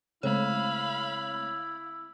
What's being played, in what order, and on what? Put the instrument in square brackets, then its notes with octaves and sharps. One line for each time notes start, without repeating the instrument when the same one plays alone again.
[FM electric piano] C#3 A3 C4 [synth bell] G#3 C#5 [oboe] E4 [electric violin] F5 B5